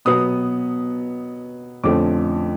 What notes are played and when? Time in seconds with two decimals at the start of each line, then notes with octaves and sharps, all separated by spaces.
0.05 B2 F#3 B3 D#6
1.84 F2 D3 F3 A3 C#4 D6